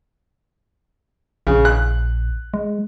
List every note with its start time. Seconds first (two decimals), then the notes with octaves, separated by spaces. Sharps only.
1.47 A#1 C#3
1.65 F#6
2.54 G#3